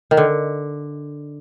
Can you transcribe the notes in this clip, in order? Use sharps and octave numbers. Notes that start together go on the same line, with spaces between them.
D#3
D3